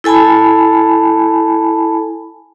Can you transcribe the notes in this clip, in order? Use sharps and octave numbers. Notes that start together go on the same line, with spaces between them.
E4 A4 G#5 A5 B5